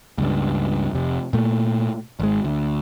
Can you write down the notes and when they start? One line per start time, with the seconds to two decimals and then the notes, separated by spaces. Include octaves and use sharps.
0.18 C#2 G2
0.93 F1 C3
1.33 A#2 A3
2.19 G#1 G#3
2.44 D2